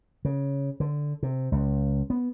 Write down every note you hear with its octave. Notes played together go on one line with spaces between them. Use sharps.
C#3
D3
C3
C#2
B3